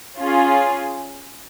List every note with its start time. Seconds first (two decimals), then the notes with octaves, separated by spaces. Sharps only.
0.19 C#4 F4 G#4